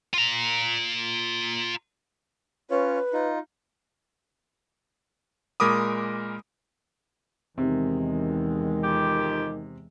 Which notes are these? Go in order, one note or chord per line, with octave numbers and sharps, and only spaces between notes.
F4 A#5
C#4 F4 B4 C#5
D#4 F4
A#2 G#3 A#4 B5 D6 D#6
E2 C3 D#3 G#3
F2 G4